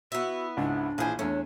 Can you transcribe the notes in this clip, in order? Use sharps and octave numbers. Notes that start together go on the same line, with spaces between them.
B3 E4 F#4
C#2 G#2 D4
A#1 E3 G#4 C5 G#5
E2 A3 C#4 D4